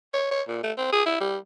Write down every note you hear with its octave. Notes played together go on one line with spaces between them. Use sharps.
C#5
C#5
A#2
A3
C4
G#4
E4
G3